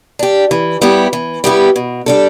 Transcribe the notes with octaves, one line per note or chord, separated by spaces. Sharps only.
D4 G4
E3
G3 B3 E4 G4
E3
G3 B3 E4 G4
B2
G3 D4 A4